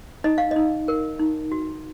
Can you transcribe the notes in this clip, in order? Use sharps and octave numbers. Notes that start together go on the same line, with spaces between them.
D#4 D#5
F5
D#4 D#5
A#4
D#4
F#4